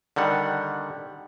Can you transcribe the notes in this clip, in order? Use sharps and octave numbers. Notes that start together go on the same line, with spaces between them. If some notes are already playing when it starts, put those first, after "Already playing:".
D3 D#3 G3 F#5